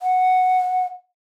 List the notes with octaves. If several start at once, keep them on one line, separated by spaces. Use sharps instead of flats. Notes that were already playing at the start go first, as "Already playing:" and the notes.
F#5